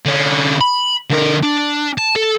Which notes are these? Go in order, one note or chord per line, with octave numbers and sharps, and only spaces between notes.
D3 C#4
B5
D3 A#4
D4
A5
A4